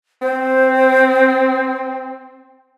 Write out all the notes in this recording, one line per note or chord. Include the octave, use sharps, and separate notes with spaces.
C4 C5